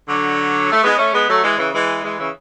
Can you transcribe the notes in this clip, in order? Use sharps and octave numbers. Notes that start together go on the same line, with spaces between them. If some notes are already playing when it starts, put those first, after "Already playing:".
D3 F#3
A3
G#3 B3
A3 C#4
G#3 B3
F#3 A3
E3 G#3
C#3 E3
E3 G#3
E3 G#3
C#3 E3